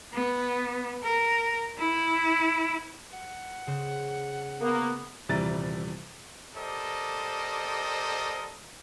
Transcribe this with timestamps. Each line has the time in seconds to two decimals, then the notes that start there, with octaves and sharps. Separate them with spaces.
0.13 B3
1.03 A#4
1.79 E4
3.13 F#5
3.67 C#3 C5
4.61 A#3 B3
5.29 D#1 C3 E3 G3 A#5 A6
6.55 G4 A4 A#4 C5 D5 D#5